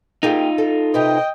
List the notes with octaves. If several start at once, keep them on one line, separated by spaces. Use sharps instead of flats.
A#3 D#4 F4 G4 G#4
A4
C3 G4 B4 D#5 G5